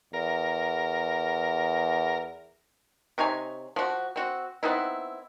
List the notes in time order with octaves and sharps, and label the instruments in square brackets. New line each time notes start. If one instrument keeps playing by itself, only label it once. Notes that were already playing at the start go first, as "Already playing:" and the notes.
[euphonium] E2 [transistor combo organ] A#4
[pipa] C3 D#4 C#5 G#5
F3 F#4
C4 F#4
B3 C4 D#4 E4